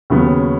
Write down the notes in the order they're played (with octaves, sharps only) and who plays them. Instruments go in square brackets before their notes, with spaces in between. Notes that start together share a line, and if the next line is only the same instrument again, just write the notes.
[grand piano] D#2 C#3 F#3 B3